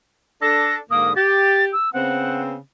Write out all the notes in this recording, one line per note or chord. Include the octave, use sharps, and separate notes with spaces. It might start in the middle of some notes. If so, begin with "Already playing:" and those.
D4 A4 A#6
G#2 D3 A#3 D#6
G4 A6
E6
C#3 B3 C4 F#5